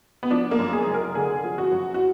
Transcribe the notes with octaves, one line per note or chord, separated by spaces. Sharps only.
B3
F3 D4
A#3
F#2
G#4
F#1
A#4
D3 G#4
F3
F#4
F#2
F#4